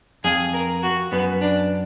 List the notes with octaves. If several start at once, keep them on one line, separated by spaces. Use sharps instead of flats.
F2 G#4
A#4
F#4
F#2 B3
D4